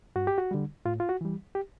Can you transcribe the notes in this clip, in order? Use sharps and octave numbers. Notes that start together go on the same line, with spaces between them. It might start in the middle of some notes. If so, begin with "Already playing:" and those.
G2 F#4
G4
F#4
D3 G3
A2 F4
F4
F#4
E3 G3
G4